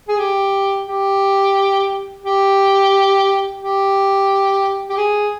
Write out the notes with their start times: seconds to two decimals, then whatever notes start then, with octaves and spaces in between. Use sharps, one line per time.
0.09 G#4
0.18 G4
0.87 G4
2.24 G4
3.60 G4
4.89 G4
4.97 G#4